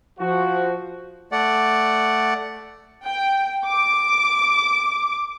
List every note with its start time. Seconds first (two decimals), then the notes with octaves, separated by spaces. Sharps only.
0.19 F3 F#4
1.32 A3 D5 F#5
3.04 G5
3.65 D6